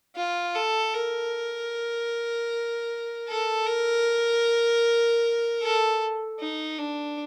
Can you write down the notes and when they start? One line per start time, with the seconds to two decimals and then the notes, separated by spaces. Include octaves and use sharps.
0.16 F4
0.55 A4
0.94 A#4
3.29 A4
3.66 A#4
5.62 A4
6.40 D#4
6.79 D4